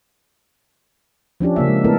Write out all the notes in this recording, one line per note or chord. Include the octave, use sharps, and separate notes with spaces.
F3 C#4 D4 G4
C#3 A#3 E5
G#3
A3 B3 E4 A4 A#4